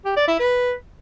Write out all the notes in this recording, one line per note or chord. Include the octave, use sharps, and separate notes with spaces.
G4
D5
E4
B4